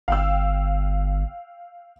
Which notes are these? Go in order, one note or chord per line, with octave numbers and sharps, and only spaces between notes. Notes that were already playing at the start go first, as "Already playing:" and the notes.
G1 F5 G5 E6